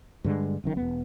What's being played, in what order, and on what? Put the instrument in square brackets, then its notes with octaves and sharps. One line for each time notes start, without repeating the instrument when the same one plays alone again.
[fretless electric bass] G2 D3 G#3
F#1 F#2 D#3
E1 B3